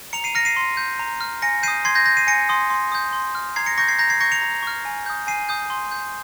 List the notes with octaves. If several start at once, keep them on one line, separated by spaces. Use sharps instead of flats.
A#5 C#7 F7
C7 D#7
F6 A#6 C#7
C7 D#7
C6
G6
A#5
F6
G#5 A#6 C#7
D#6 G6 C7 D#7
C6 G#6 C7
G6 A#6
G6 A#6
C7 D#7
G#5 A#6 C#7
C6 D#6
C6
D#6 G6
C6
F6
A#5 G#6 C7
A#6 C#7
C#6 G6 A#6 C#7
G#6 C7
A#5 G6 A#6
G#6 C7
C#6 G6 A#6 C#7
C#7 F7
A#5
C#6 F6
G#5
D#6 G6
G#5 C7 D#7
D#6 G6
C6
G6